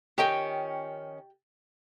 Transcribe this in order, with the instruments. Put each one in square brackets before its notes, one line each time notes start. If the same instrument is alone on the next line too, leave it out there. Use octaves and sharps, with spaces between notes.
[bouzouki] D#3 F3 C#4 [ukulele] G4 D#5 G5